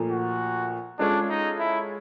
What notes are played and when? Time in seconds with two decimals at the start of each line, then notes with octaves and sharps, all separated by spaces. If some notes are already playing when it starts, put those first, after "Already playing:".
Already playing: A#2 F3 A3
0.11 F#4
0.99 G#3 C#4 D4 F4 A4 C#5
1.29 D#4
1.59 E4